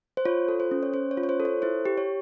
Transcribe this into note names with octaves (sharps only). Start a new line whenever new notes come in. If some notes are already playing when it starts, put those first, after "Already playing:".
C5
F4 C#5
A4
C5
C#4
C#5
C#4 C5
C#5
F4
C#5
C5
A4
C#5
E4 C5
G4
C#5